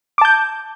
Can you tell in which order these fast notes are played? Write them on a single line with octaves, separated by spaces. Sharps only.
D6 A5 G6